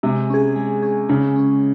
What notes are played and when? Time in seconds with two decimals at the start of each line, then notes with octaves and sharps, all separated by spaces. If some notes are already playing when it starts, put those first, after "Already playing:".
0.03 C3 G#3
0.30 C#4 G#4
0.56 G#3
0.82 C#4 G#4
1.09 C#3 G#3
1.36 C#4 G#4